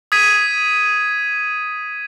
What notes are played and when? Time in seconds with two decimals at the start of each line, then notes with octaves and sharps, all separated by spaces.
0.12 D#6 G#6 B6 D#7